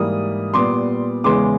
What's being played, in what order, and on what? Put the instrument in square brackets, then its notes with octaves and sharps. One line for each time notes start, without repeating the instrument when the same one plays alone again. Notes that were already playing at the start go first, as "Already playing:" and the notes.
Already playing: [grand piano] G#2 E3 G3 A#3 D#6
A#2 G3 B3 C6 D6
E2 C#3 E3 G#3 B3 C6 D6